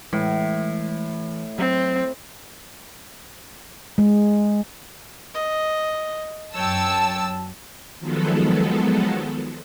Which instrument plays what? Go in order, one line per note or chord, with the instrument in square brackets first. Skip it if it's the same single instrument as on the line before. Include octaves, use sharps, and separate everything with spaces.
[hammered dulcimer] A2 [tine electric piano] E3 [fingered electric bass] G#3
[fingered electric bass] F#3 [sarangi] C4
[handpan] G#3
[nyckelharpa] D#5
[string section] F#2 A5 E6 [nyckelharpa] C#5 G5
[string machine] D#3 F3 F#3 G#3 B3 A4